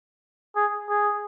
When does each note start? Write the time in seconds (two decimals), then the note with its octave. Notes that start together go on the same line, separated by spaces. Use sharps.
0.56 G#4
0.89 G#4